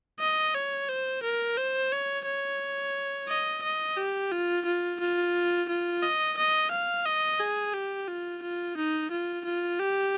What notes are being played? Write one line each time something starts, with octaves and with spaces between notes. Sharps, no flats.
D#5
C#5
C5
A#4
C5
C#5
C#5
D#5
D#5
G4
F4
F4
F4
F4
D#5
D#5
F5
D#5
G#4
G4
F4
F4
D#4
F4
F4
G4